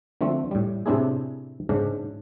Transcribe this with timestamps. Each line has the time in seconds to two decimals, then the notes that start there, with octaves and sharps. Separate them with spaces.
0.21 D3 F3 A3 C4
0.51 A2 G3
0.86 A2 C3 C4 D4 E4 G#4
1.69 G#2 C#3 D4